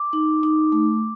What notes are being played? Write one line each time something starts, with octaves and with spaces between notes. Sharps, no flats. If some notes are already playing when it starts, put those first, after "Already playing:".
Already playing: D6
D#4
D#4
A3